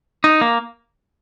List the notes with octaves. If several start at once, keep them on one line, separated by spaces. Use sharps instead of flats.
D#4
A#3